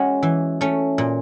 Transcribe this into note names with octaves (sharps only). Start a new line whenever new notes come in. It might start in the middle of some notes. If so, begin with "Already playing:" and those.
Already playing: G#3 C#4 F#4
E3
A3 C#4
A#2